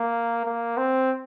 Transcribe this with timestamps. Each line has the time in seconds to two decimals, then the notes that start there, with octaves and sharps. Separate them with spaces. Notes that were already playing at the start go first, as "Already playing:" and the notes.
Already playing: A#3
0.45 A#3
0.77 C4